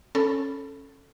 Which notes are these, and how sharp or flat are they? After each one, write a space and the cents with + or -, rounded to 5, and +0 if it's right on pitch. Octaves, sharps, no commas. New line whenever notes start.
C#4 -15 A4 +0 B5 +0